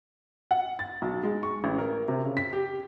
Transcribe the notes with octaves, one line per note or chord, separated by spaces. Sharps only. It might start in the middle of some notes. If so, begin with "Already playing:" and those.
F#5
A6
B1
G#3
C#6
A1
A#4
C3
C#3
B6
G4